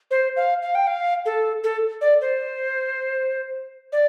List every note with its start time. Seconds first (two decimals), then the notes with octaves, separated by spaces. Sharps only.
0.11 C5
0.36 F5
0.62 F5
0.75 G5
0.87 F5
1.26 A4
1.64 A4
2.01 D5
2.21 C5
3.92 D5